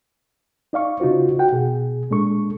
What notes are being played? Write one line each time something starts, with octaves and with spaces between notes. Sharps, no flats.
D#4 D5 F5 C#6
C#3 D#4 F4 F#4 C5
F#4 F#5 G5
B2 G#4
A#2 G#3 D4 A4 C#6